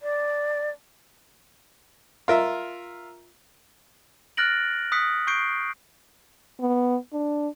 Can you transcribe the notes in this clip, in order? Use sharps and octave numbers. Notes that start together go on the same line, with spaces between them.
D5
F4 A#4 E5
F6 F#6 A6 A#6 D7 F#7
D#6 F#6 B6 C#7
C#6 G6 C7 D7
B3
D4